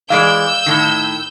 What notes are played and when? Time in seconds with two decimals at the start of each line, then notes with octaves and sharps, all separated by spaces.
0.10 E3 G#3 D5 F5 E6 G6
0.66 A2 D#3